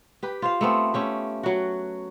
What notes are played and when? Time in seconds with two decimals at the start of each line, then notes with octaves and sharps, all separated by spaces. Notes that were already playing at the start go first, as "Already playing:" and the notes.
0.23 G4 B4
0.42 F4 C5 F5
0.61 A3 B3 C4
0.94 A3 C#4 G4
1.43 F#3 F#4